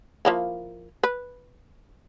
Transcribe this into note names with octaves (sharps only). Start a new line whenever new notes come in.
F3 A#3 E4
B4